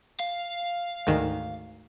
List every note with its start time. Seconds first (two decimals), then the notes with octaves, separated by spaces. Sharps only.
0.20 F5
1.07 D2 G#2 D#3